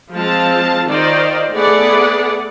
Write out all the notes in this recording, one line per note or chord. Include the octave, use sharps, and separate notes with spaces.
F3 G#3 C4 F4 A5
D#3 D#4 F4 C5 D5
A3 B3 G#4 D5 F#5